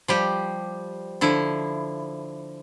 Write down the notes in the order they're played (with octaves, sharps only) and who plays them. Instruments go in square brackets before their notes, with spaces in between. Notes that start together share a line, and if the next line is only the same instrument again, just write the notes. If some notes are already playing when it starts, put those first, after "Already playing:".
[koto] F3 G3 G4
D3 F3 E4